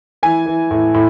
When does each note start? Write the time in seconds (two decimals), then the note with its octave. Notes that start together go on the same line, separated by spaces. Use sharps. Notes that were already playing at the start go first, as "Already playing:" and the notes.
0.23 E3 G#5
0.46 E3
0.71 A2
0.94 A2